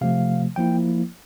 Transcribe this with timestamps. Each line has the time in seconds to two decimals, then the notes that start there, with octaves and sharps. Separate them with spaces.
0.01 C3 F3 A3 F5
0.56 F3 A#3 E4 G5